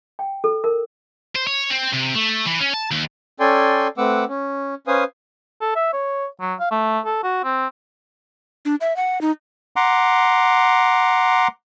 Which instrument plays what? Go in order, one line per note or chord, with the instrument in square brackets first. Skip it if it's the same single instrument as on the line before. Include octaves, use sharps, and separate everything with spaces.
[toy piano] G5
A4
A#4
[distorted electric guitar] C5
C#5
C4
C3
A3
E3
C#4
A5
D#2
[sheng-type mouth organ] C#4 A4 D5 G5 G#5 C6
A3 C4 B4 F#5 D6 E6
C#4
C#4 B4 C5 F5 G#5 D#6
[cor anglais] A4
E5
C#5
F#3
F5
A3
A4
F#4
C4
[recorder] D4
E5
F#5
D#4
[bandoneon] F#5 A#5 C6 D6